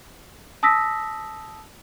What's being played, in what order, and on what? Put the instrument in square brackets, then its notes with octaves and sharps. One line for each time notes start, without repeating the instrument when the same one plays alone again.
[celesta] A5 D#6 E6 A#6 B6